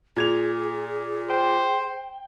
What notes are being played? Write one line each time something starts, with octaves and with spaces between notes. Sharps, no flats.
A#2 G#4 G#6 F7
C5 G5